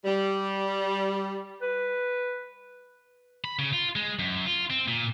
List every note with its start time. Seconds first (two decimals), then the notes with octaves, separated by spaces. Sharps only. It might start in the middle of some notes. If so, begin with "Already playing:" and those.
0.05 G3
1.62 B4
3.44 B5
3.59 C#3
3.73 F4
3.96 G#3
4.19 F#2
4.46 F4
4.70 C4
4.88 A#2